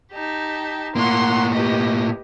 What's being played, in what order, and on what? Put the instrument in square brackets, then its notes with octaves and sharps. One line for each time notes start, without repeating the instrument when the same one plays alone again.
[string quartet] D#4 G4 A5
[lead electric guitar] A2 A#3 [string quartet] F#5 A#5 C6
[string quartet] G4 B4 D#5